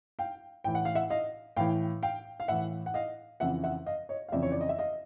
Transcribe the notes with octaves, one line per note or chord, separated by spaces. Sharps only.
F5 G5
A2 E3 G5
F#5
F5
E5 F#5
D#5 F5
A2 E3 F5 G5
F5 G5
F5
A2 E3 E5 F#5
F#5
D#5 F5
F2 C#3 E3 E5 F#5
E5 F#5
D#5 F5
C#5 D#5
F5
F2 C#3 E3 D5 E5
C#5
D5
D#5
E5
D#5 F5